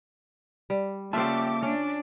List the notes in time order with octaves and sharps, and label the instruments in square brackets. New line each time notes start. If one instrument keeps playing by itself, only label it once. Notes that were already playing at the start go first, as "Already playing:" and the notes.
[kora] G3
[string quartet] C#3 G4 D6 [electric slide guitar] A#3 E5 A5 [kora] F4 C5
[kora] C#4 [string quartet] D4